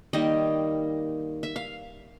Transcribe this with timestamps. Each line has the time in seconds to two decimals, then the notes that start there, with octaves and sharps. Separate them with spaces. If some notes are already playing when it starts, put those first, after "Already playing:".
0.13 D#3 G3 A#3 D#5
1.43 E5
1.56 F5